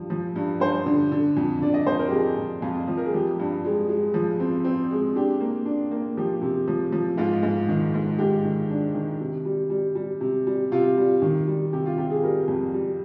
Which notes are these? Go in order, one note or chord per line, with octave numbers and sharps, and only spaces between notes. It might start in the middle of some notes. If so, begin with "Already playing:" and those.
Already playing: G2 F3
F3
G2
G2 C5
D3
D3
F2
D3 D5
D#5
F2 C5
A#4
G4
F2 G#4
F2
F2 F4
F3
A#4
G#4
F3 G4
G2
G#3
G#3
F3
C4
C4
G#3
D4 G4
A#3
D4
A#3
F3 G4
C3
F3
F3
G#2 F4
G#2
D#3
G#2
G#2 G4
D#3
D4
D#3
C3
G3
G3
G3
C3
G3
C3 F4
G3
D#3
G3
C3 G4
F4
C3 G4
G#4
G3 A#4
F2
G3